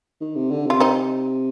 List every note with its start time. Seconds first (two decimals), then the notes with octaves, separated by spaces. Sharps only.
0.21 D#3
0.36 C3
0.51 D3
0.66 C3 F4
0.80 C4 D#4